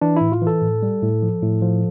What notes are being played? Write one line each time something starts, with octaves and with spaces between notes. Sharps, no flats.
E3 D4
A2 E4
F4
E3
A4
A2
G3
A2
F3
A2
F3